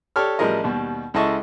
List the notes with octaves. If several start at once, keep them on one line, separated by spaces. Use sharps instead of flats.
G4 A4 C#5 D5 F6
A1 F3 G3 G#4 A#4 D#5
D#2 B2 G3
C#2 E4 A4 D#5 A5 C#6